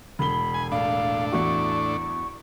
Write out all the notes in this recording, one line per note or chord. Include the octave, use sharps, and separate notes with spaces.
E1 B5 G7
G#5
A2 D4 F5
E2 E4 F#4 C#6